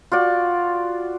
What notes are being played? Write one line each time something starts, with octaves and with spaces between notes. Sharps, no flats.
F4 F#4 D5